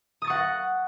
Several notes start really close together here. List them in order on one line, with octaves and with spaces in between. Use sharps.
D#6 A6 C#6 F#5 A#6